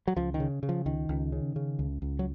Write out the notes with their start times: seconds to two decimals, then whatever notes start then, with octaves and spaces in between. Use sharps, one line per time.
0.07 F#3
0.16 C#2 F3
0.34 D#3
0.40 C#3
0.63 C#3
0.69 F3
0.86 C#2 D#3
1.09 C#2
1.32 C#3
1.56 C#3
1.79 C#2
2.02 C#2
2.19 F#3